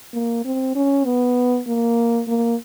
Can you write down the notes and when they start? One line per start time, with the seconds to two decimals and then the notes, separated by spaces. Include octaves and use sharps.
0.13 A#3
0.45 C4
0.76 C#4
1.05 B3
1.67 A#3
2.28 A#3